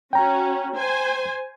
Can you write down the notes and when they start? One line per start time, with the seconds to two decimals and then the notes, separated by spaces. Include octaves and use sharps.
0.13 C#4 F#4 G5 A#5
0.75 C5 G#5